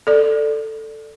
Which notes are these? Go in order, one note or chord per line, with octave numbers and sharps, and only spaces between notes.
A4 D5